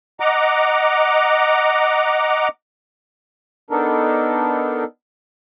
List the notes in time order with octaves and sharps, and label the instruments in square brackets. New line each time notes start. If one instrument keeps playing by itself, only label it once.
[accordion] D#5 F#5 A#5 D6
[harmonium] B3 D4 D#4 A4 A#4